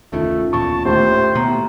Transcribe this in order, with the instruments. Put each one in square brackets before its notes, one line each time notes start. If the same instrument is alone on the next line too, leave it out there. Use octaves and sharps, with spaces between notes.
[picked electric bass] F1 D2 D#3 [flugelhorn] A3 [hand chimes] C#4 F4
[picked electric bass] D1 E2 A#2 [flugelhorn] A5 [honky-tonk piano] C#6
[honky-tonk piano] D#2 A2 [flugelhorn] C5
[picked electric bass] B2 A#3 B3 [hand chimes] A#5 C6